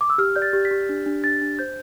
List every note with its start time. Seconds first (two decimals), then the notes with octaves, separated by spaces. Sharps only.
0.01 D6
0.10 E6
0.18 G4 F6
0.36 D5 G6
0.42 A6
0.53 G4
0.65 B6
0.71 G4
0.89 D4
1.06 D4
1.24 D4 A6
1.42 D4
1.59 C5 G6